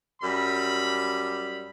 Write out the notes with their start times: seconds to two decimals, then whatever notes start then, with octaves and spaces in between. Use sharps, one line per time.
0.22 F#2 G3 B5